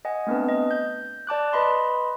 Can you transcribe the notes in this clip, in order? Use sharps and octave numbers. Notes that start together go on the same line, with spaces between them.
D#5 F#5 G#5
A3 B3 C4 D4 B4
D#5
G6
D5 A5 D6 F#6
B4 D#5 B5 C6